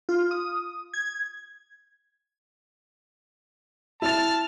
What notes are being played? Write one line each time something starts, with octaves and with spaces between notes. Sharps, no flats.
F4
D#6
G#6
E4 A5 F6 A6